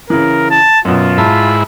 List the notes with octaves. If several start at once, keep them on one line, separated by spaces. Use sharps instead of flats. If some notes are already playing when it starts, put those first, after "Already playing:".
C#3 E3 A#4
A5
F#2 B2 F4
G#2 E4 A5 B5